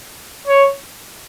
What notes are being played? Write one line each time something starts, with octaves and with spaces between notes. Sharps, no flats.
C#5